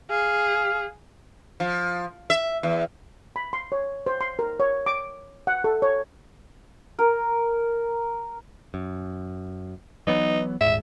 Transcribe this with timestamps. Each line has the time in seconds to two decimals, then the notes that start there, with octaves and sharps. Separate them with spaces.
0.10 G#4 F5
1.60 F3
2.30 E5
2.63 E2
3.36 B5
3.53 C6
3.72 C#5
4.07 C5
4.21 C6
4.39 A#4
4.60 C#5
4.86 D6
5.47 F#5
5.64 A4
5.82 C#5
6.99 A#4
8.74 F#2
10.07 E3 F#3 B3 D#4
10.61 D#1 G#2 E5